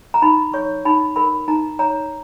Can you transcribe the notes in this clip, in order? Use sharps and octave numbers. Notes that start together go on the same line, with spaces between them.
A#5
D#4 B5
C#5 C#6
D#4 B5
A#4 B5
D#4 A#5
C#5 A#5